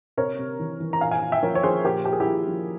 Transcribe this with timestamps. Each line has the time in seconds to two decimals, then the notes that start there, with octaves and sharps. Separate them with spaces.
0.17 C3 A#4 C#5
0.39 C3
0.59 E3
0.80 E3
0.93 A#5
1.01 A#2 F5 G#5
1.11 F5 G#5
1.22 A#2
1.32 E5 G5
1.43 F3 A#4 C#5
1.55 C#5
1.63 F3 G#4 C5
1.84 A#2 G4 A#4
2.05 A#2 G4
2.13 G#4
2.20 E4 G4
2.26 F3
2.47 F3